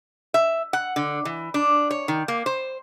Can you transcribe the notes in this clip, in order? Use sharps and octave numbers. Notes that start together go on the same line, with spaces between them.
E5
F#5
D3
E3
D4
C#5
D#3
A#3
C5